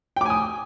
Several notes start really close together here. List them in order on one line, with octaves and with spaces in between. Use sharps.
G5 D6 G#5 D#6